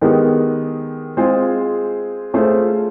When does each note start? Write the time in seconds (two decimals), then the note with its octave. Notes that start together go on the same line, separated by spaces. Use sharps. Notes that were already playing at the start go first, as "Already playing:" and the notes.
0.01 D#3 G#3 B3 D#4 G4
1.17 G#3 C4 F4 G#4 C5
2.34 A3 C#4 F4 G#4 C5